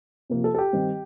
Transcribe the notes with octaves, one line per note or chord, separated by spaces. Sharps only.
C3 F3 A#3
A4
A4
G4
D#3 G3 C4